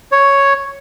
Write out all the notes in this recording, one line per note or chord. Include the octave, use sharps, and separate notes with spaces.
C#5